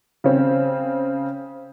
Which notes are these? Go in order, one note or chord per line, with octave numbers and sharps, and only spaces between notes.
C#3 C4